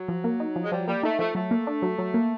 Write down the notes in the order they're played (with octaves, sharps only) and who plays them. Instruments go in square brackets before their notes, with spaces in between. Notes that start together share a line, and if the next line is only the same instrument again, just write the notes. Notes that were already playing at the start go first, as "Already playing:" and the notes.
Already playing: [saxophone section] F#3
[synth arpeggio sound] F3
A#3
D#4
F3
[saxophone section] G#3
[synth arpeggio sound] F3 [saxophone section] G3
[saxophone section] G3 [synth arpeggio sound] A#3
[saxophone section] A3 [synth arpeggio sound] D#4
[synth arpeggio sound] F3 [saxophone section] A3
[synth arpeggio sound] F#3 [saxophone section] A3
[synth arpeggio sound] A#3
D4
F#3
F#3
A#3